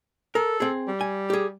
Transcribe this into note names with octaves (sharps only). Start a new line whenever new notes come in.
A4 A#4
C4 G#4
G3
G#5
G4 G#4